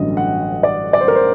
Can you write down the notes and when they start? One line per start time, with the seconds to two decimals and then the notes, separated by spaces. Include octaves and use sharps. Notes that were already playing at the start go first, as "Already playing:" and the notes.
Already playing: A1 G2 D3 F#3 D#5
0.17 F#5
0.63 D5
0.93 D5
1.01 C5
1.08 A#4
1.15 C5